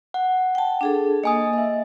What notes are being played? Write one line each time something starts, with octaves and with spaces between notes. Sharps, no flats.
F#5
G5 A5
D4 G#4 A4
A#3 D#5 G#5 D#6
D#5 E5